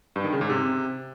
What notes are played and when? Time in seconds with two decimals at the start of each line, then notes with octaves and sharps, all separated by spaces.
0.16 G2
0.24 D#3
0.33 C#3
0.41 G#2
0.49 C3